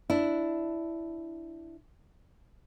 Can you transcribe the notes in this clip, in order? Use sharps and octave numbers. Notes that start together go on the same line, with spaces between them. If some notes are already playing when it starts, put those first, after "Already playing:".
D4 E4